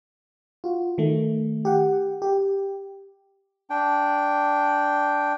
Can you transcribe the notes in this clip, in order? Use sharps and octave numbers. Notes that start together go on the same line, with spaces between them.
F4 F#4
D#3 A3
G4 F#5
G4
D4 G5